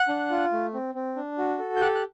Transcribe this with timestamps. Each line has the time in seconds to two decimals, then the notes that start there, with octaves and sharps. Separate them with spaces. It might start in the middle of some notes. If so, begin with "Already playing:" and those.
Already playing: F#5 F#6
0.09 D4
0.30 F4
0.52 A3
0.74 C4
0.95 C4
1.16 D4
1.38 F#4
1.59 A4
1.76 G6
1.81 G4 F#5 F#6
1.95 F#6